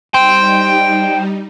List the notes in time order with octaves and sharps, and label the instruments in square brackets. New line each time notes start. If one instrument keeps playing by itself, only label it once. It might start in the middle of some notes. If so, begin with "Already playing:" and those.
[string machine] G3 D#4 [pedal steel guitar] C5 [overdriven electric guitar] G5